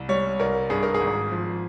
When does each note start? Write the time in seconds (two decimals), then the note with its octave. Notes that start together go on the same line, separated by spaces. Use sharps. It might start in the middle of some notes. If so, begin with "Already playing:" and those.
Already playing: C2
0.09 G3 C#5
0.40 C2 A#4
0.70 G2 G#4
0.83 A#4
0.94 G#4
1.01 G#1
1.31 F3